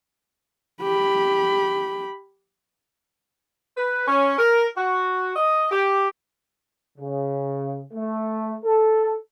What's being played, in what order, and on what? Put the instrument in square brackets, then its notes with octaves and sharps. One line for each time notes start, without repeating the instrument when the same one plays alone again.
[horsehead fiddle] G4 B5
[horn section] B4
C#4
A#4
F#4
D#5
G4
[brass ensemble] C#3
A3
A4